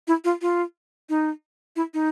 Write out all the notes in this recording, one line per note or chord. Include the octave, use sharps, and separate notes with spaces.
E4
F4
F4
D#4
E4
D#4